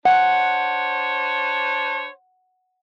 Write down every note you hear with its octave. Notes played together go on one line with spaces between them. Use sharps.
D4 C5 C#5 F#5